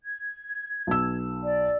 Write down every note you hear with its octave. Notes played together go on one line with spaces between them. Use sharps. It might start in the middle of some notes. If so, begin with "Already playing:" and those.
G#6
B1 E6
D5